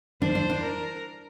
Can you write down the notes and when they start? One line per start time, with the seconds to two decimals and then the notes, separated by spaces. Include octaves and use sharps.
0.22 D4 C5
0.35 D4
0.50 D4
0.62 A#4